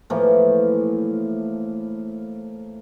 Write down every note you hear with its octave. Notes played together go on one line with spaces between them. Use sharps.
A2 E3 F3 A#3